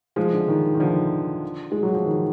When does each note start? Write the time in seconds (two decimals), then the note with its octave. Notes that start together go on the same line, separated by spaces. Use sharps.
0.16 F3 G#3
0.33 D3
0.48 D#3
0.74 D#3
0.80 D3 F3
1.72 G#3
1.83 F#3
1.94 F3
2.06 D#3